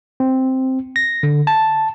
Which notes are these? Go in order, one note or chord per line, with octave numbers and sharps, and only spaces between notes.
C4
A#6
D3
A5